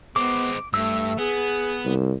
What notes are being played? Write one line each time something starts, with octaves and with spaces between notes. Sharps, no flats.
G#3 B3 C4 D6
G2 A3 E6
B3 G#4
C2